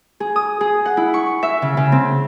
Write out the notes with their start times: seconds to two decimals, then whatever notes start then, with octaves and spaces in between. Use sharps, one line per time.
0.20 G#4
0.36 D#6
0.61 G#4
0.85 F#5
0.97 E4
1.14 C#6
1.43 E5
1.62 C#3
1.77 C#3
1.92 C4